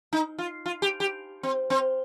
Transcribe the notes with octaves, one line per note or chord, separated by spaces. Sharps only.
D#4
F4
F4
G4
G4
C4
C4